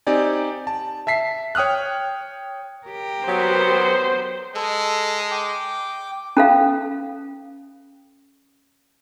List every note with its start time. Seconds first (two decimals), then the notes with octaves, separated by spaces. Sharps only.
0.07 C4 D#4 G4 D5 G#5
0.67 A5
1.07 E5 A5 B6 C7
1.55 C#5 G5 D#6 F6 F#6
2.87 G4 A#4
3.28 F#3 B3 C5
4.55 G#3 A4
5.31 G5 D6
6.37 C#4 A4 F5